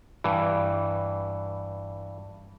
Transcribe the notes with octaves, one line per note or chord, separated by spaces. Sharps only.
G2 E3